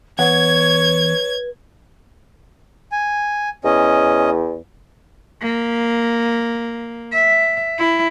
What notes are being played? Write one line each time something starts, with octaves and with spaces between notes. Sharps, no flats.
E2 B4 C#5 F#5 G#6
G#5
E2 C#4 D#5
A#3
E5
E4